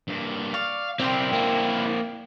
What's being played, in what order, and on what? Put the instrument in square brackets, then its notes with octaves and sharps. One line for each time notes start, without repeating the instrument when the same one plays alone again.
[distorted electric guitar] G2 A#3
[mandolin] D5 C#6 [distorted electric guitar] F5
[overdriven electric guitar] B1 C4 [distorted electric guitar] E4 A#4 [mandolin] D5 G5 C6
[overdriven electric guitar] A#3 C4